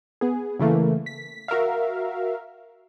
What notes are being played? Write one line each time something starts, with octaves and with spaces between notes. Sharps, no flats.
B3 G#4
C#3 E3 A3 A#3
B6
F#4 A#4 E5 F5